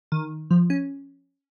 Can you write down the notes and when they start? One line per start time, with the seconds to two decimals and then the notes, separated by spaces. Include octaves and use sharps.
0.12 D#3
0.51 F3
0.70 C#4